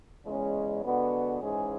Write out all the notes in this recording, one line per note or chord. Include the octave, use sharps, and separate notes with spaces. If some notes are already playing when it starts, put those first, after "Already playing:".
E2 C#3 G#3 C#4
D3 G#3 B3 F#4
G#2 E3 G#3 C#4 G#4